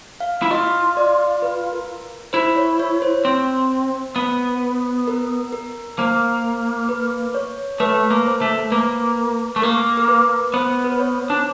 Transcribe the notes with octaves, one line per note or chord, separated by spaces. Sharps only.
F5
E4
F4 D#5
D5
B4
A#4
E4 C5
C#5
C#5
C5
C4
B3
A#4
A#4
A#3 C5
B4
C#5
A3 B4
A#3
C5
A3
A#3 B4
A3
A#3 A#4
A#4
B4
B3 C5
B4
C5
C#5
D4